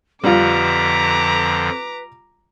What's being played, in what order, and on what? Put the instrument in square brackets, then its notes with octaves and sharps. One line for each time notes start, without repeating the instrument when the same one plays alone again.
[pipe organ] F2 D3 F3 [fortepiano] G3 F4 [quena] B4 [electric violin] A#5 D6